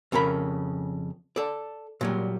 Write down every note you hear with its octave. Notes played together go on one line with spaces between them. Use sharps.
F2 C#3 C#4 A#4 B5
A4 D5
A#2 F#3 G3